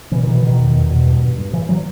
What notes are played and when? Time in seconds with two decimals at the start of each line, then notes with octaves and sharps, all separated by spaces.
0.11 B2 E3
0.23 D#3
0.27 B2
0.35 E3
0.43 B2 D#3
0.59 E2
0.75 E2
0.90 B2
1.06 G2
1.22 G2
1.38 G2
1.53 G2 E3
1.69 F#3